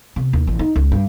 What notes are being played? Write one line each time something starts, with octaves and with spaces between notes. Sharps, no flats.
C3
D#2
A1
D#4
C#2
G2